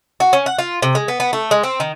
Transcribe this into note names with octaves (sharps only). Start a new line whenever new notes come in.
F#4
C#4
F#5
F4
C3
G#3
B3
B3
A3
G#3
C4
D#3